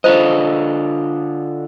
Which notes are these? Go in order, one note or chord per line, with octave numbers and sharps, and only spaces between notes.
D3 F4 C5 D#5